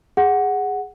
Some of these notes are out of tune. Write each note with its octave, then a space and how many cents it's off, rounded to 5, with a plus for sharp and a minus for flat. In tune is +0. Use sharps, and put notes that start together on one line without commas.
G#4 -15 F#5 +0